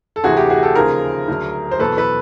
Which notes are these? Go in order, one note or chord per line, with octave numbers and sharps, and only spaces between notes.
A4
D2 C3 E3 F#4 G#4
G4
F#4 G#4
G4 A4
D#2 C#3 F3 G#4 A#4
D2 D3 F#3
C5
E2 B2 F#3 A4 B4
A4 B4